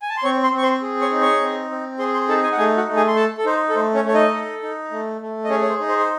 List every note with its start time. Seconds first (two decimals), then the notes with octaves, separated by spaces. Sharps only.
0.02 G#5
0.09 A5
0.17 C6
0.23 C4 C#5 C#6
0.43 C5 C6
0.53 C4 C#6
0.62 C5 C6
0.82 G#4
1.01 C#5 C#6
1.11 D#4
1.21 C#5 C#6
1.41 C4
1.71 C4
1.99 G#4 C5 C6
2.13 C5 C6
2.28 D#4 A4 A5
2.43 G#4 G#5
2.52 F#5
2.57 A3 G#4 G#5
2.77 F#4 F#5
2.88 A3
2.96 G#4 G#5
3.07 C6
3.16 A4 A5
3.38 A4
3.45 D#4 C5
3.69 A4
3.75 A3 C5
3.94 C#4 C#5
4.05 A3 C#5
4.14 D#4 D#5
4.33 A4
4.63 D#4
4.91 A3
5.21 A3
5.44 D#5
5.50 C#4 G#4 C#5
5.62 C#5
5.69 C5
5.80 D#4
5.89 C5
5.99 C5